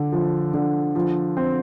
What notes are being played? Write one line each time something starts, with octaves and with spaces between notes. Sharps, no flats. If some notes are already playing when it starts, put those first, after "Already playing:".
Already playing: D3
F3
D3
F3
C4